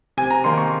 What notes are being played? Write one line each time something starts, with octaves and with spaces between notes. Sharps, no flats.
C3 G#5
A#5
D#3 A#3 C6
C#6